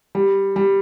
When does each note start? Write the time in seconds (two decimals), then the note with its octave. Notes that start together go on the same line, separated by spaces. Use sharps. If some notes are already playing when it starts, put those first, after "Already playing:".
0.15 G3
0.56 G3